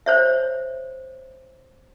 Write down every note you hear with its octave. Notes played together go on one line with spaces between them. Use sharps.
C5 C#5 E5